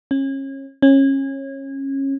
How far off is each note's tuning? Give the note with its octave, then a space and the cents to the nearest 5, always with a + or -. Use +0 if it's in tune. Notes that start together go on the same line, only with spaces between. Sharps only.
C#4 -30
C#4 -25